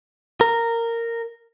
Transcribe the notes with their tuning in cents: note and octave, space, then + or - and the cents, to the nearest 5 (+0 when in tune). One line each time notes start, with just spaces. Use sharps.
A#4 -10